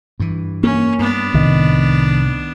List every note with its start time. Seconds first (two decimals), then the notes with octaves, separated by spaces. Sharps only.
0.20 G2 E3
0.63 A#3 C#4
0.99 G2 B3 D4
1.34 C2 A2 D#3